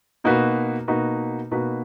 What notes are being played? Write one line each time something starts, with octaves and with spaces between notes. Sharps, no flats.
B2 A#3 D#4 F#4 B4
B2 A#3 D#4 F#4 B4
B2 A#3 D#4 F#4 B4